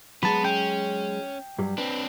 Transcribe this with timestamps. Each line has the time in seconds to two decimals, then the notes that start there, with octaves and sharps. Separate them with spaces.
0.23 F#3 G#3 B3 A5 B5
0.45 C#4 G5
1.59 G2 F#3 G3
1.78 C4 D4 B4